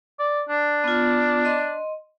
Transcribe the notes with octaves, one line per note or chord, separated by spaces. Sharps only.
D5
D4
B3 F4
D#5 C6